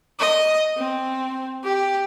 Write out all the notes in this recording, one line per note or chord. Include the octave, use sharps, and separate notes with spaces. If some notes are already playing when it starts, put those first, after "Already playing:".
D#5
C4
G4